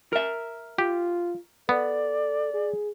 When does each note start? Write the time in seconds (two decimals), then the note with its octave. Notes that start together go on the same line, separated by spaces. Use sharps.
0.13 A#4 E5
0.78 F4 G4
1.69 B3 A4 D5
2.54 G#4